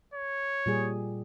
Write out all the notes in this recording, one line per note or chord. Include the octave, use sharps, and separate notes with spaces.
C#5
A#2 G3 G#4